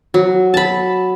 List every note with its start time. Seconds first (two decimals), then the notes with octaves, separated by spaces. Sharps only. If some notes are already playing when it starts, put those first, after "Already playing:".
0.14 F#3
0.54 A5 B5